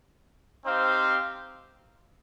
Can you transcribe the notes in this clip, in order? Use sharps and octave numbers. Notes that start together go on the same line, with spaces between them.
C4 D#4 G4 C5 F5